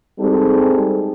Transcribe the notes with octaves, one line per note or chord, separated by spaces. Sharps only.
G3 G#3 C4 D#4 G#4 A4